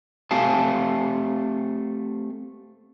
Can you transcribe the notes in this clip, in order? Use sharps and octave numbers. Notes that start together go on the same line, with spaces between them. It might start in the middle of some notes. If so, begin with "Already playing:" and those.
A3 C4 G4 F5 G#5 A5